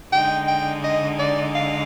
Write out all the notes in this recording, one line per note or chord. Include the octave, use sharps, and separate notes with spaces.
D3 G#3 D#4 G5
G5
D#5
D5
F5